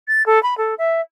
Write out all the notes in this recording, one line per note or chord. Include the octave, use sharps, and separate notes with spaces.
A6
A4
B5
A4
E5